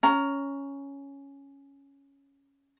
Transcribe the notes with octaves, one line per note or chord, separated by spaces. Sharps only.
C#4 A#5